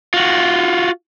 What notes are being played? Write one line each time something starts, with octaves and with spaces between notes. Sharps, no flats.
F4 F#4